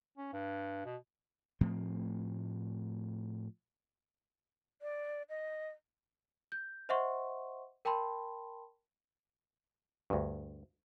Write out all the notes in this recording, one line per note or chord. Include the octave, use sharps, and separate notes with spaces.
C#4
G2
B2
A2 F3 A3 C4
D5
D#5
G6
C5 D#5 E5 F#5 C6 C#6
A#4 G5 A5 B5 C6
D2 G2